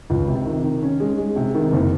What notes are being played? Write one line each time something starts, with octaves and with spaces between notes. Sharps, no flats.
C#2
C3
D#3
D#3
C#4
G#3
G#3
C3
D#3
F#1